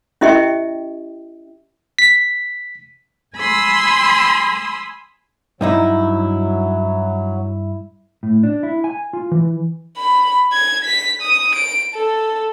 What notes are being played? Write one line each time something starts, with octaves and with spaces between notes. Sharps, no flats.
C#4 E4 G4 D#5 E5 G5
B6
G#5 B5 C6 D#6 E6
G2 F#3 D#4 E4
A2
D4
E4
G#5
F4
E3
B5
G#6
B6
D#6
D7
A4